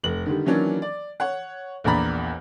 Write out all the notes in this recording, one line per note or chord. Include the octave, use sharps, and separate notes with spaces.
F1 F#7
D3 D#3 G3
D#3 E3 F#3 A#3 C#4 D4
D5
C#5 F#5
A#1 E2 A#2 D5 A#5 B5